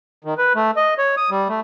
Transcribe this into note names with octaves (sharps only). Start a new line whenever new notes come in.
D#3
B4
A3
D#5
C#5
D#6
G3
A3